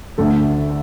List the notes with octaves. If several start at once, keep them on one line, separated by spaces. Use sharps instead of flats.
D2 D3 A3 A4